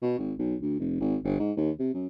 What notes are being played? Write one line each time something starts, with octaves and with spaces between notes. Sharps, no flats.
B2
G#1
B1
D2
F1
G#1
G1
G#2
D#2
C3
F#2